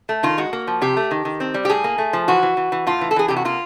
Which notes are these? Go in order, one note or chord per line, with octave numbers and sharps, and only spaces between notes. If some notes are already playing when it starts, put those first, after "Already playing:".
A3
D#3 F4
G#3 F#4
A#3
F3
C3 G4
A3
D#3
D#3
C4
G3
G4
A2 G#4
A#3
A3
F3
E3 F#4
E3
E3
E3
A2 F4
E3
A4
E3 G#4
C3 G4
F#4
A#3 F4